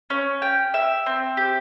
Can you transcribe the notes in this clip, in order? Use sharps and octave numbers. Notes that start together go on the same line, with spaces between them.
C#4
G5
E5
C4
G4